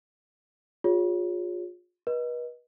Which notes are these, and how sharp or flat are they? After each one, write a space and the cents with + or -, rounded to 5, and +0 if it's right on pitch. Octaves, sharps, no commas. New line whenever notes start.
F4 +30 G#4 -25 C#5 +10
B4 -35 D#5 +0